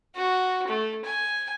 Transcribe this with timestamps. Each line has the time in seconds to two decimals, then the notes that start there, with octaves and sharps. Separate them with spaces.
0.15 F#4
0.68 A3
1.05 G#5